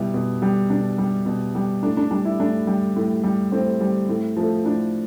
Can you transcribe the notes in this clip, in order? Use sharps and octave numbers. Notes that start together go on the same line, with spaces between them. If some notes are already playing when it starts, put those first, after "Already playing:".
Already playing: B2 G3 E4
B2
G3
B2 D4
G3
B2
G3
A2 D4
D4
G3 D4
E4
A2 D4
G3
A2
G3
A2 C4
G3
A2
F3 A3
A2 D4